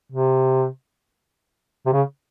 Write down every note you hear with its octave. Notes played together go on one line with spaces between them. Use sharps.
C3
C3
C#3